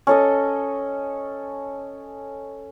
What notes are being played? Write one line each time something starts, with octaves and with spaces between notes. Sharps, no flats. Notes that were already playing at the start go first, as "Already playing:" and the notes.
C#4 A4 D#5